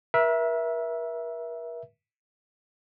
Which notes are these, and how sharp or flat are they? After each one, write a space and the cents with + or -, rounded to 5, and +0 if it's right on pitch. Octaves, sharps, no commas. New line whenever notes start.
A#4 +45 E5 +0